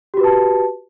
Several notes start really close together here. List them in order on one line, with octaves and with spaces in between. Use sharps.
G4 F#4 B4 A5